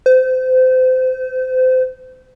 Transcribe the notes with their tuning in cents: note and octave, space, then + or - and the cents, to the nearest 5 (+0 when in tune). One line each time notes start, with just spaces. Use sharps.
C5 -30